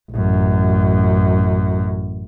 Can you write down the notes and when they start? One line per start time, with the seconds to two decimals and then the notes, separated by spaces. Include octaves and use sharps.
0.11 A1 F#2